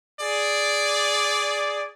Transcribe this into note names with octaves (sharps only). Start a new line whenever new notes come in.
G#4 D5